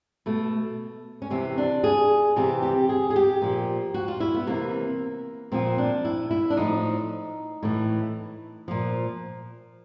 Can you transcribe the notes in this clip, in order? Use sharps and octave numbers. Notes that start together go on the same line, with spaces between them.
B2 A3
C#4
C3 E3 C4
D4
G#4
C3 E3 G4
G4
G#4
G#4
G4
A#2 F3
F#4
F4
E4
B3
C3 E3 A#3
A#2 F3 C4
D4
E4
E4
D4
A2 F3 D#4
A2 E3
A#2 F3